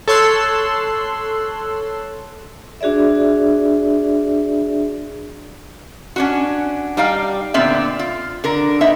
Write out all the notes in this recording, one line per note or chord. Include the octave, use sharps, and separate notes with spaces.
A4 C#5 C6 E6 F#6
D4 F#4 G#4 D5 E5
C#4 D4 F#4
G3 D#4 D5 F5 G5
A#2 D3 B3 C4 D5 E5
F4
D3 A#4
B3 D#4 E5